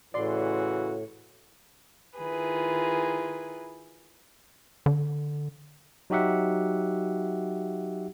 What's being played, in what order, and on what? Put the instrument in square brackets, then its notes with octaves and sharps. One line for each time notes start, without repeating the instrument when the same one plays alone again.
[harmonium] A2 [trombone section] C#3 E3 F#4 [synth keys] D5 C6
[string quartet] D#3 E4 F4 G#4 B4
[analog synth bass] D3
[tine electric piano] F#3 D#4 F#4 G4 E5 F#5